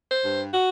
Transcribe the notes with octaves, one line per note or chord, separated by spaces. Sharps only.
C5
G2
F#4